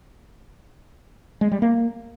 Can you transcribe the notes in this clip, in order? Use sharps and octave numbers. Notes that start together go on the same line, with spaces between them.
G#3
G3
A#3